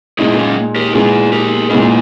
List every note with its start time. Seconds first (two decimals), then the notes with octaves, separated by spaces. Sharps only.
0.19 A#2 G#3 D#4 E4 G#4
0.37 A#3 C#4
0.76 G4 A#4
0.94 A#2 G#3 D#4 E4 G#4
1.32 G4 A#4
1.70 A#2 G#3 D#4 E4 G#4